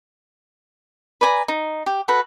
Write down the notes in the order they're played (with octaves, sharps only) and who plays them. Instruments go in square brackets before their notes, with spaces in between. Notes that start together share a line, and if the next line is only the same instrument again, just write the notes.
[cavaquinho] B4 D5 G#5 A#5
D#4
G4
F#4 A4 B4